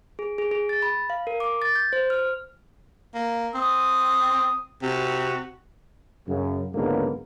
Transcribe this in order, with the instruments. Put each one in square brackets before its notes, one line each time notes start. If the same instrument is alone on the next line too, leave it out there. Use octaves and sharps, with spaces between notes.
[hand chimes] G#4
G#4
G#4
A6
B5
F5
A#4
D6
A6
G6
C5
F6
[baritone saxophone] A#3
[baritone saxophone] C4 [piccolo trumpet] D#6
[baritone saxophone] C3 [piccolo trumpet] F#4
[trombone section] F#2 C#3
C#2 G#2 D3 F#3 A#3 B3